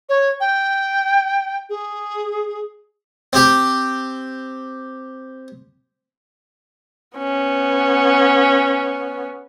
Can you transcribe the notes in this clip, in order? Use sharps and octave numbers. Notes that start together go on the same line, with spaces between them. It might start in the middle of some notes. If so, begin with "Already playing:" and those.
C#5
G5
G#4
C4 G4
B3 C#4